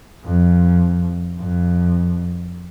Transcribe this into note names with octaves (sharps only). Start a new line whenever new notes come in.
F2
F2